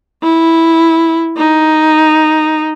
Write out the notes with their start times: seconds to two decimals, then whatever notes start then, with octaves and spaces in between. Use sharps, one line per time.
0.23 E4
1.37 D#4